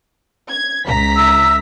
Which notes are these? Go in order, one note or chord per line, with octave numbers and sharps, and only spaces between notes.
G#6
C#2 A#5 B6
E5 E6